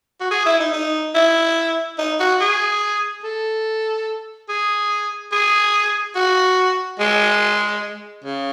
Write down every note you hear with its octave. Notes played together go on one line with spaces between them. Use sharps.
F#4
G#4
E4
D#4
D#4
E4
D#4
F#4
G#4
A4
G#4
G#4
F#4
G#3
C#3